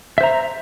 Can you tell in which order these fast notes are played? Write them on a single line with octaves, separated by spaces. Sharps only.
E5 C5 A#5